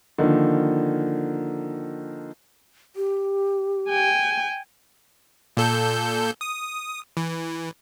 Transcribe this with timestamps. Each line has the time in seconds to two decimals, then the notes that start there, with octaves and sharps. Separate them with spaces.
0.18 D3 D#3 F3 A#3
2.96 G4
3.89 G5 G#5
5.57 A#2 A4 G6
6.41 D#6
7.17 E3